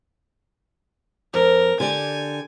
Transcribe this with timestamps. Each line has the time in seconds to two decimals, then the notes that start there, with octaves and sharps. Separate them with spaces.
1.34 F2 A#4
1.80 D3 G4 D5 G#5